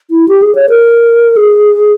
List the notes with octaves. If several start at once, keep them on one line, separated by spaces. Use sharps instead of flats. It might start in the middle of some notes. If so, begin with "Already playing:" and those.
E4
G4
G#4
C#5
A#4
G#4